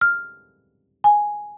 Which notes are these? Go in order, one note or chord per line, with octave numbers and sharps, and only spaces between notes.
F6
G#5